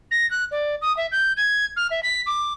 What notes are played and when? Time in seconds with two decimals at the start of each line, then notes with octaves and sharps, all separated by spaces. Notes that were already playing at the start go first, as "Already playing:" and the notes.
0.11 A#6
0.31 F#6
0.51 D5
0.82 D#6
0.97 E5
1.12 G6
1.37 G#6
1.76 F6
1.91 E5
2.03 B6
2.27 D6